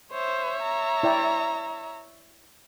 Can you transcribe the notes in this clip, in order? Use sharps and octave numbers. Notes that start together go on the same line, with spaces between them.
C5 C#5 E5
A#5
E4 D5 G5